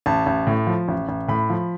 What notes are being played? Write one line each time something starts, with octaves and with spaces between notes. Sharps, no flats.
A1 A5
A1
A2
F3
A1
A1
A2 B5
F3